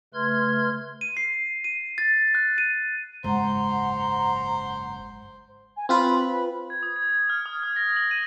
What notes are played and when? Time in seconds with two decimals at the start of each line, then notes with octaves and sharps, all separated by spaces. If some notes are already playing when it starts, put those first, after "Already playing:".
0.14 C#3 A3 B4 C6 F6 G#6
1.01 D#7
1.17 C7
1.64 D#7
1.98 A6
2.35 F#6
2.58 D#7
3.24 F#1 C#2 G#2 C5 F#5 A#5
5.77 G#5
5.89 C4 F4 B4 B5
6.70 G#6
6.83 D#6
6.96 G#6
7.09 G#6
7.30 F6
7.46 D#6
7.63 F6
7.76 A#6
7.97 F#7
8.11 D#7